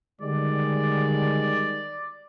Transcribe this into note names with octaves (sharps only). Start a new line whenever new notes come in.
D3 D#3 G3 G#3 D5